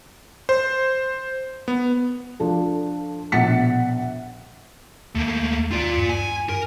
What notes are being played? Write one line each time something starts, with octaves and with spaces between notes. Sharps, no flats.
C5
B3
F3 D4 A4
A#1 B2 F#5 A6 B6 C#7
D#2 A3 A#3
D#2 F4 D5
G2
G#5
A#4